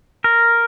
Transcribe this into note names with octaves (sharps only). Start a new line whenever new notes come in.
A#4